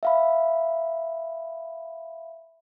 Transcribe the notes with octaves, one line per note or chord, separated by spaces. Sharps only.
E5 F5 B5